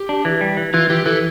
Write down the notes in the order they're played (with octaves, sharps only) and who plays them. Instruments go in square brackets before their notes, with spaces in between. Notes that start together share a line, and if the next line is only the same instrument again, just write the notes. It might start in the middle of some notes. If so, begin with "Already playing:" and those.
Already playing: [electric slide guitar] G4
[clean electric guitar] D4
E3
G3
E3
[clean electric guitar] E3 [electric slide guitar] F4
[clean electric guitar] E3 [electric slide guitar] G4
[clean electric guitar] E3 [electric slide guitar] A4